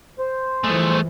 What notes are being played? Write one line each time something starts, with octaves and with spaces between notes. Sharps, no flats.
C5
E3 F3 A3 G#4